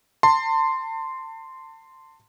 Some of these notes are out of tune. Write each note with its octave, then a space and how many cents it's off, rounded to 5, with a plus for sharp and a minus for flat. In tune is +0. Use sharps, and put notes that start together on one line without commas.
A5 +35 C6 -5